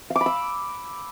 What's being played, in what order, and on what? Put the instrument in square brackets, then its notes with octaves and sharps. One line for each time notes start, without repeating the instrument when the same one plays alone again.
[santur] F5
D6
B5
E6